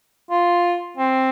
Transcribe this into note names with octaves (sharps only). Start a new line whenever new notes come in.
F4
C4